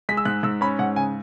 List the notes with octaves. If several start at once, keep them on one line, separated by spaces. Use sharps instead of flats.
G#3 B6
E6
G#2 F#6
G#2 E6
C#4 B5
G#2 F#5
C#3 G#5